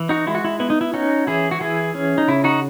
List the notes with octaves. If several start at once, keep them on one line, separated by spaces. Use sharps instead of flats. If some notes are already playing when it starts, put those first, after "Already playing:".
Already playing: E3
D#4 F#4
G#3 E4
F#4
E4
B3 E4
D#4
E4
C#4 D#4 F#4
E3 E4 G#4
F#4
E3 E4 G#4
C#4
D#4
C#3 E4
D#4 F#4